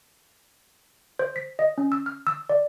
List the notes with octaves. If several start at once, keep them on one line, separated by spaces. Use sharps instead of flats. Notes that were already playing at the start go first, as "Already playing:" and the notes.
C5
B6
D#5
C#4
E6
F6
E6
D5